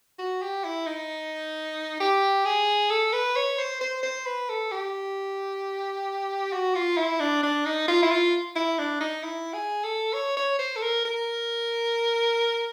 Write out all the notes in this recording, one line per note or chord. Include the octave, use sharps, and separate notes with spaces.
F#4
G4
E4
D#4
G4
G#4
A4
B4
C#5
C5
C5
C5
B4
A4
G4
F#4
F4
E4
D4
D4
D#4
F4
E4
F4
E4
D4
D#4
E4
G#4
A4
C#5
C#5
C5
A4
A#4
A#4